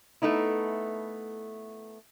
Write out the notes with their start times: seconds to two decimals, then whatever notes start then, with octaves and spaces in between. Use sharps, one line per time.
0.22 A3 B3 D#4 E4